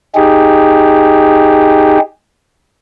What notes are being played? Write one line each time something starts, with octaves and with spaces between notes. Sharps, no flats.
D#4 G4 G#4